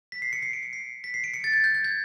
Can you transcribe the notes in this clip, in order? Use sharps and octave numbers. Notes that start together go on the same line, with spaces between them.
B6
C7
C#7
C7
D7
C#7
C7
B6
C7
D7
C#7
A6
G#6
G6
G6
G#6